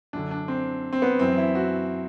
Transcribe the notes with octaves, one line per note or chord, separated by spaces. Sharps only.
F#2 D3 D4
D4
C4
C4
B3
F#2 E3 C4
E4
F#4